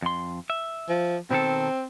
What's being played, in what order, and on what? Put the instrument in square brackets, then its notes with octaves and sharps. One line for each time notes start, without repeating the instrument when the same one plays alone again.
[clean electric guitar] F2 C6
E5
[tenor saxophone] F3
[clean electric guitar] B2 D#3 A4 [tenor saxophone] C4